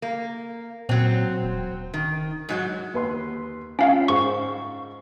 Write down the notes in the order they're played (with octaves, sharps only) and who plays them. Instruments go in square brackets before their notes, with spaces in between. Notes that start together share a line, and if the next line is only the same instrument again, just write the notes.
[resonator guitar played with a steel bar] A#3
[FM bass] A#2 [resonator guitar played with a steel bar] F#3 C4
[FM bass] D1
[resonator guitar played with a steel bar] D#3
G#2 F#3 F#4
[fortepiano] D#2 B4 C6
[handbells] C#4 F5 [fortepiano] F4 E5 G5
[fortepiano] G#2 C5 [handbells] C#6